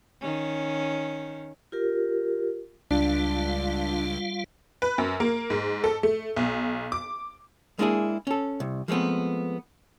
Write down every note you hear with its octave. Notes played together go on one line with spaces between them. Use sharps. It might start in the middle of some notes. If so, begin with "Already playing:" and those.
D#3 C#4
F4 G4 A#4
C#2 G3 D4 F4 F5
B4
F#2
A#3
G#2
A4
A3
B1
D6
G#3 A#3 D4 E4 G4 G#4
C#4 A4
C2
F3 G#3 A3 B3 C4